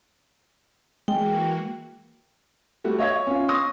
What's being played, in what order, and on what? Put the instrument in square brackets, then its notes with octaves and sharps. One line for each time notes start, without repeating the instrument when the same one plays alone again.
[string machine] E3 A#3 F#4 [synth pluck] G#3 [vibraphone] G5
[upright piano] G3 A3 F#4
C#5 D#5 E5 G#6
C#4 F4
C6 C#6 D#6 A#6